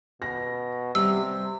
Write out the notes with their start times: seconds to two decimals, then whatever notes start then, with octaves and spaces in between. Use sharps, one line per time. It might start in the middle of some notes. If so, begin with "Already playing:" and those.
0.22 B2 A#6
0.95 C3 G3 E6